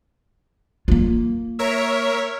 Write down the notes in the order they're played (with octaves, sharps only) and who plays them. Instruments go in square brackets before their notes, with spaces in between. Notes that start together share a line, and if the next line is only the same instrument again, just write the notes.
[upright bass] A#3 F4
[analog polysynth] A#4 C#5 E5